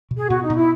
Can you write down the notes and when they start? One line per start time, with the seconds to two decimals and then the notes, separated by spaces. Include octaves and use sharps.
0.11 B2
0.17 G#4
0.29 B2 F#4
0.43 D#4
0.50 B2
0.56 E4